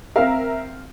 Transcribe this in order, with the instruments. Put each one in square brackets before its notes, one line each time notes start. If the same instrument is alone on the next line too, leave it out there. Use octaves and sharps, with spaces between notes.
[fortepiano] C4 F5 [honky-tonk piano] A#4 E5 A#5